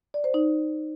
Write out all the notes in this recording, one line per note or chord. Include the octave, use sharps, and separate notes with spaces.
D5
C5
D#4